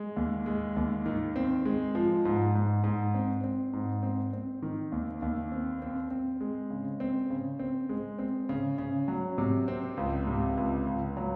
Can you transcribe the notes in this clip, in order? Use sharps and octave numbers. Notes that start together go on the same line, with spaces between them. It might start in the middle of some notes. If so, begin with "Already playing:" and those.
Already playing: G#3
D#2
G#3
D#2
D#3
C4
G#3
F3
G#2
G#2
G#2
C4
C4
G#2
C4
C4
D#3
D#2
D#2
C4
C4
C4
G#3
C#3
C4
C#3
C4
G#3
C4
C#3
C#3
F#3
C3
C4
C#2
C3
C#2
C#2
F#3